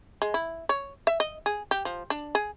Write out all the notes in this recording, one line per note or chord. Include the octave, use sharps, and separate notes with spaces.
G#3
E4
C#5
E5
D#5
G#4
G4
F3
D4
G#4